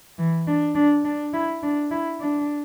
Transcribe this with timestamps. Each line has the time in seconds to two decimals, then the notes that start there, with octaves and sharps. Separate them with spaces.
0.18 E3
0.47 D4
0.75 D4
1.05 D4
1.33 E4
1.63 D4
1.91 E4
2.20 D4